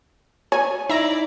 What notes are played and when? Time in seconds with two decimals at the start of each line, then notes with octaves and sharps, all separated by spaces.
0.52 C#5 G#5
0.90 D#4 E4 D5 E5 A#5